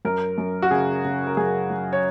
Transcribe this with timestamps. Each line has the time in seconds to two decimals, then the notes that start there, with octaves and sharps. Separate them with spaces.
0.05 F#2 A#4
0.38 F#2
0.62 F#4
0.71 C#3 G#4
1.05 C#3
1.27 A#4
1.37 F#2 G#4
1.70 F#3
1.93 C#5